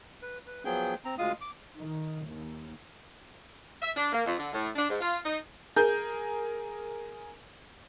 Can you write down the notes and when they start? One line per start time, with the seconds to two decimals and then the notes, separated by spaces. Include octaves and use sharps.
0.22 B4
0.47 B4
0.65 F3 F#3 B3 G#4 G5 G6
1.05 C4 A#5
1.18 D2 G#3 F4 F5 D#6
1.41 D6
1.77 D#3
2.28 D#2
3.82 E5
3.96 D4
4.13 A#3
4.25 F2
4.38 D3
4.53 A2
4.76 D4
4.88 G#2
5.01 F4
5.25 D#4
5.76 G#4 A#4 G6